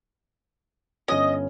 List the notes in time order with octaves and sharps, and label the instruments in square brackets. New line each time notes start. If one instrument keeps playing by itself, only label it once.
[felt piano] G1 C#4 [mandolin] D#5